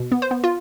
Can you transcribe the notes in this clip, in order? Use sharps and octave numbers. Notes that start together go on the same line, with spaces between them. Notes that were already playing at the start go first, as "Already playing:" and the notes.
Already playing: B2
B3
C5
B3
F4